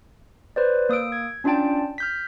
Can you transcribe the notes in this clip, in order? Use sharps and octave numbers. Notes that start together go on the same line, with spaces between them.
B4 C5 D5
A#3 D#6 E6 D7
G#6
C#4 D4 F4 D5 G5 A5
F6 G6 B6